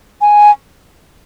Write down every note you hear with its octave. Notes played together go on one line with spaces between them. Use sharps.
G#5